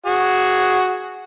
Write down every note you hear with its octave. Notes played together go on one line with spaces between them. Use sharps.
F#4 G#4